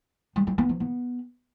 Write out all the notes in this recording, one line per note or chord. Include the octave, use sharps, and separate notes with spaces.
G3
F#3
B3
F3
B3